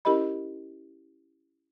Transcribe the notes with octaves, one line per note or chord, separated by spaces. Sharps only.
C#4 E4 G4 A#4 D#5 B5